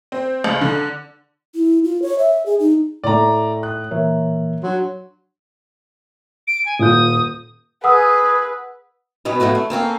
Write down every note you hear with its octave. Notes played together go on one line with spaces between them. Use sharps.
C4
C#2
D3
E4
F4
C#5
E5
G#4
D#4
A2 A3 D5 A#5
D#6 F#6
A#2 E3 A#3 A#4 C#5 E5
F#3 D4 F#4 C6
D7
G#5
D#1 F4 D#6 G6
G#4 B4 F#5 D#6 E6
B2 F#3 B3 C#4
A2 F3 A3 F#4
A3
A#3 C4 C#4 A4